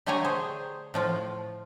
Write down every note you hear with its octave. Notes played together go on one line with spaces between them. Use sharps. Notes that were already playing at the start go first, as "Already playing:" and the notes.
D3 A3 G4 C#5 G#5 A#5
G#4 C5
A2 F3 F4